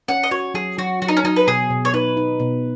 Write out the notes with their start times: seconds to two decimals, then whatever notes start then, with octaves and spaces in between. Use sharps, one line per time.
0.08 C#4 F#5
0.23 D#5
0.31 F#4 C#5
0.54 F#3 G#4
0.78 F#3 F#4
1.02 F#3 F#4
1.08 D#4
1.17 C#4
1.24 F#3 D#4
1.36 B4
1.47 B2 G#4
1.70 B2
1.85 C#5
1.94 D#4 B4
2.17 D#4
2.40 B2